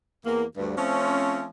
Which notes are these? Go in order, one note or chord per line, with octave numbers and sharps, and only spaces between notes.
E2 A#3
D2 G2
F3 A3 C4 C#4